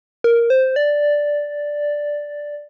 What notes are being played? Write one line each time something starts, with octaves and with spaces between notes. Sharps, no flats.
A#4
C5
D5